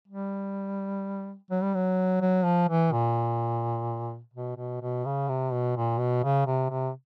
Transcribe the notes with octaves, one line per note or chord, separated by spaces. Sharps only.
G3
F#3
G3
F#3
F#3
F3
E3
A#2
B2
B2
B2
C#3
C3
B2
A#2
B2
C#3
C3
C3